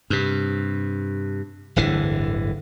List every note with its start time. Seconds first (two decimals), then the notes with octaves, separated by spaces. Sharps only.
0.10 G2 C3
1.76 D1 G1 D3 E3